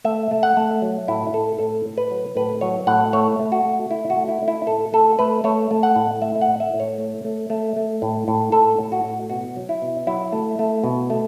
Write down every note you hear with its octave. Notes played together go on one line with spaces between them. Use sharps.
A3 E5
A3
F#5
A3
F#3
A2 E4
A2 A4
A2 A4
A2
B4
F#3
A2 B4
F#3 C#5
A2 F#5
A3 C#5
A3
F#4
A3
A3 E4
F#4
A3
E4
A3
E4
A2 A4
A3 A4
A3 B4
A3 C#5
A3
F#5
A2
A3 E5
F#5
A2
E5
A2
C#5
A3
A3
A3
A3
A2
A2
A2 A4
A2
F#4
A2
B2 F#4
F#3
E4
B2
F#3 E4
A3
A3
B2
A3